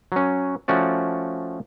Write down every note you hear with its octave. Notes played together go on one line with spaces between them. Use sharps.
F#3 C#4
F3 A3 C#4 F#4 D5